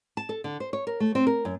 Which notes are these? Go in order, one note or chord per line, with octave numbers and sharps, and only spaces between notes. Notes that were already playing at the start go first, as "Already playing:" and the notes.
A5
A4
D3
C5
C#5
A#4
A3
C4
A#4
F#2